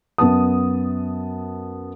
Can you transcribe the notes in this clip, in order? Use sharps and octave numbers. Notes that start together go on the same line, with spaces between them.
F#2 B3 A5 D#6